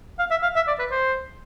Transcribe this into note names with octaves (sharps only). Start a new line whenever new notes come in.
F5
E5
F5
E5
D5
B4
C5